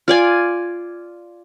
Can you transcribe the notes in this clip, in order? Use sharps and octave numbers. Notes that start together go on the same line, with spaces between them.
F4 D5 G#5